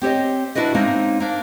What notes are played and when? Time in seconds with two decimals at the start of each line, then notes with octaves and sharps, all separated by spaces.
0.02 C4 G4 C#5 D#5
0.55 D4 E4 F#4 B4 D#5
0.74 G#3 A#3 C4 C#4 D#4
1.20 A#3 D4